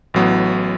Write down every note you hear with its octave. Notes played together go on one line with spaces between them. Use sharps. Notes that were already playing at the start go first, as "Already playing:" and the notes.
A1 A2 F#3 B3